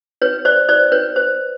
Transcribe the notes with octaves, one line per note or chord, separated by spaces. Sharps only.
B4 C#5
C5 D5
C5 D5
B4 C#5
C5